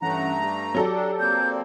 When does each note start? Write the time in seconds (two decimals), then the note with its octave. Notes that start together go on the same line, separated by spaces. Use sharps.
0.02 G2 E3 A3 C#4 F#5 A#5
0.42 G3
0.75 F#3 G4 A4 D5
0.94 D4
1.20 A#3 C4 G6